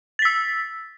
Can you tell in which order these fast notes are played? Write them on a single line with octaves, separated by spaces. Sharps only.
A6 B6 E6